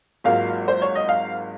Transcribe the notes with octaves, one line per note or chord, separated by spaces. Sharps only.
G#1 G#2 F#3 A#3 F4 F5
C5
C#5
D#5
F5